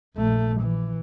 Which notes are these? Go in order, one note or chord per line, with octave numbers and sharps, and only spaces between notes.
A#1 A3
E3